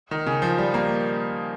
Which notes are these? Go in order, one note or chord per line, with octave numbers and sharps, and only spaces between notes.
D#3
C#3
F3
G3
A#3